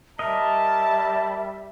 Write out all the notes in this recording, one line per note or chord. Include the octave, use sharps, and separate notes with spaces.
G3 A#4 D#5 E5 A5